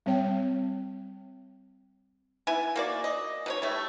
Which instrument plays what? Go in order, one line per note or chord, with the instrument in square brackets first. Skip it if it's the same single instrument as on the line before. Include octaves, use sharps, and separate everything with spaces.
[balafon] G3 C4 C#5 G5
[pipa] B3 E4 G#5
A#3 F#4 D5
D#5
B2 C4 C#5
G3 A3